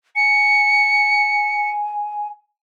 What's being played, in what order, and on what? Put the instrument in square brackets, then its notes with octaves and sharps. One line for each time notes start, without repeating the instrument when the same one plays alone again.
[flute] G#5 [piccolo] C#7